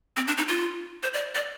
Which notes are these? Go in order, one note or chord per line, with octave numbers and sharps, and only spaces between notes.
C4
D4
D#4
F4
C5
D5
D5